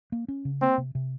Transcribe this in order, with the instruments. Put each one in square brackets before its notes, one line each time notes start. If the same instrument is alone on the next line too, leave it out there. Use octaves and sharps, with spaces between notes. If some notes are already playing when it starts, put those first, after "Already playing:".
[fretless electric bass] A#3
C#4
C#3
[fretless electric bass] A#3 [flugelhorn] C4
[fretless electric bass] C3
C3